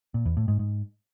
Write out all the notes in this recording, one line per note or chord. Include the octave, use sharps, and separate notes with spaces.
A#2
E2
A2
G#2
G#2